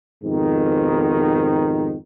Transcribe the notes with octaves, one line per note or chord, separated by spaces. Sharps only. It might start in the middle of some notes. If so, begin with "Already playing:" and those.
F2 G#2 B2 D#3